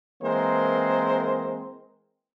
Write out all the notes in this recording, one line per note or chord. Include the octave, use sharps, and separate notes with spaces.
E3 G#3 A#3 C4 A#4 C5